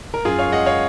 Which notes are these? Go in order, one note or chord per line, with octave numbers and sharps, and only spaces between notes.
A#4
F#2 F4 G#4
C#5 F5
G#3 D#5 F#5
C#5 F5